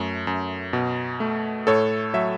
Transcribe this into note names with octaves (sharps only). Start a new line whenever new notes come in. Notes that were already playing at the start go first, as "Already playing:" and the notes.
Already playing: F#2 A3
F#2
B2
A3
A2 A4 C#5
F#3 E5